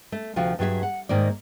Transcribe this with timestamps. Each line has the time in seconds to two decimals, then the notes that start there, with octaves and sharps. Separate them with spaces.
0.12 A3
0.36 D2 C3 F3 F#4 F5 G5
0.59 G2 F#3 G#4 E5
0.83 F#5
1.09 G#2 D#3 A#3 D5